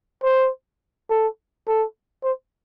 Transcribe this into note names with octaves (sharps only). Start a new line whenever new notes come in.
C5
A4
A4
C5